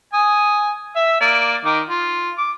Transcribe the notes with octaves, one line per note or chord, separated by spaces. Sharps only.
G#5 D#6
E5 E6
A#3 D5
D#3 D#4 D6
F4
D6